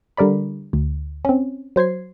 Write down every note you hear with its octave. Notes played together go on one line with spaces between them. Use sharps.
D3 G3 A#4 D5 B5
D2
C4 C#4
F#3 C5 G#6 C7